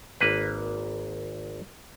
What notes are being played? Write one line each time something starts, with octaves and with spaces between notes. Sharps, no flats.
G#1 A#3 B4